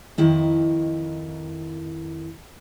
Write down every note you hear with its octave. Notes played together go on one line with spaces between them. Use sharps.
F2 D#3 E4 D#5